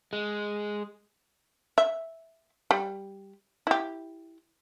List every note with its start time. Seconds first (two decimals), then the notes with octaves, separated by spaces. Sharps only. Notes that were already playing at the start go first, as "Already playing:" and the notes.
0.13 G#3
1.78 E5
2.71 G3
3.67 E4 G4